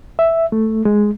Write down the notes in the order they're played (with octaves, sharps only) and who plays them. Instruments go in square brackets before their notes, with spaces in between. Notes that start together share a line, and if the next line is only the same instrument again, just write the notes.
[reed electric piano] E5
A3
G#3